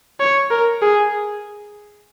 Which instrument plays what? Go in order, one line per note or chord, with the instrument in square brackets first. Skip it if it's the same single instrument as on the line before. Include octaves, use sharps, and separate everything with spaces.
[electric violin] C#5
A#4
G#4